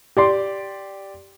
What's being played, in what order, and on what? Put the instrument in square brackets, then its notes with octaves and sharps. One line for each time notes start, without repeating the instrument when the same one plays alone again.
[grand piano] G4 D5 C6